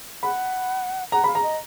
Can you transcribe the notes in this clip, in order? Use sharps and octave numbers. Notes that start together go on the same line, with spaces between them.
F#5 B5
F#5 A#5
F5 B5
A#5
D#5